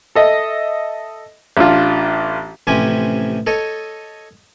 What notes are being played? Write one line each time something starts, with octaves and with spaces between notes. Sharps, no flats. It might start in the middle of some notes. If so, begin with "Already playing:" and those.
A4 D#5 E5
A1 D4 F4
A1 C3 F3 C#4 G4 G#5
A4 C#5 D#5